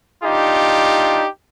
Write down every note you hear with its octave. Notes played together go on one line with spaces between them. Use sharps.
D4 D#4 F4 G4